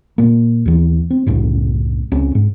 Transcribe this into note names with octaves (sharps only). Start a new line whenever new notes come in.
A#2 A#3
D#2 E3
C4
C2 F#2 A2 C#3
C#2 C4 C#4
G#2